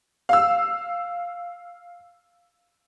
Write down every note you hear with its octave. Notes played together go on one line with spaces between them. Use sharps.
F5 E6